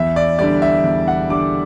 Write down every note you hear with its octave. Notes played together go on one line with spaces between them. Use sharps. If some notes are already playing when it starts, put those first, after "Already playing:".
Already playing: E2 E5
D5
D3 G3 D4 D5
E5
E2
F#5
D3 G3 D4 D6